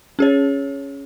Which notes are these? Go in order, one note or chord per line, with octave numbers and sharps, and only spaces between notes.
C#4 G#4 C#5